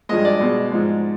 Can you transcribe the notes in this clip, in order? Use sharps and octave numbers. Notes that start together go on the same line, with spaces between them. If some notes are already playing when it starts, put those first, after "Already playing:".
G2 F3 G#3 D#5
D5
B2 G#3
G#2 F3 G#3